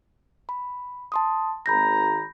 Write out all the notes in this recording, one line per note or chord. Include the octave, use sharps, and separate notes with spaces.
B5
A5 C6 D#6
G#1 A#5 B5 G6 A#6